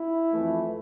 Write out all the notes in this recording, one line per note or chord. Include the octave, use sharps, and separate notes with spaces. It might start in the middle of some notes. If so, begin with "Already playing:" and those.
Already playing: E4
F2 E3 A3